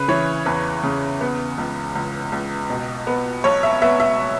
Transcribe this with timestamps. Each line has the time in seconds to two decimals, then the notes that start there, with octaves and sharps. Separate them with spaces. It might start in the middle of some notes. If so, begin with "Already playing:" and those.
Already playing: C#3 B4
0.08 E3 C#5
0.46 E2 B4
0.83 C#3
1.21 B3
1.58 C#2
1.95 C#2
2.32 C#2
2.70 B2
3.07 B3
3.44 B1 C#5
3.63 E5
3.82 B3 E5
4.00 E5